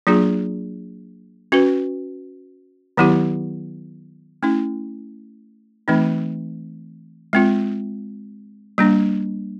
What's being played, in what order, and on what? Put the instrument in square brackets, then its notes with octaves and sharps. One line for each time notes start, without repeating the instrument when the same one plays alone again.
[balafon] F#3 A#3 D4 F4 G#4
C#4 F#4 B4
D#3 F#3 B3 E4 G4
A3 C#4 E4
E3 A3 C4 D#4
G#3 C4 F4
G3 A#3 D4